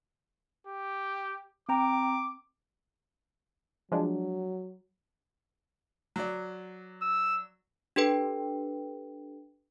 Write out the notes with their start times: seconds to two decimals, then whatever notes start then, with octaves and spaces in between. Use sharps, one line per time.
0.67 G4
1.69 C4 G5 A#5 D6
3.92 F3 F#3 G#3 D4
6.16 F#3 D5
7.02 E6
7.96 D4 G4 A4 B4 G5